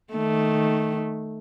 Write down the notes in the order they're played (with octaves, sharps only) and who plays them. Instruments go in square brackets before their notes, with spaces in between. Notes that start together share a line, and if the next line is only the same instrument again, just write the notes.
[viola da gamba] D#3 A3